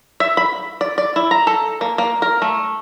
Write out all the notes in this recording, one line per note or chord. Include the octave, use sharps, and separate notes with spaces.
E5
B5
D5
D5
E4
A#5
A4
A#3
A#3
A#4
A3